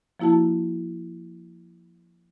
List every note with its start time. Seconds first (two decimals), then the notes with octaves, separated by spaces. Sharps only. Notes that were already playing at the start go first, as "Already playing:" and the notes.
0.20 F3 A#3 E4 F#4 A5